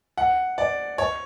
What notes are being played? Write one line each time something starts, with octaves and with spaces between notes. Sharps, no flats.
F#5
D5
C#5